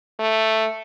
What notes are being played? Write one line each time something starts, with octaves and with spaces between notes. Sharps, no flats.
A3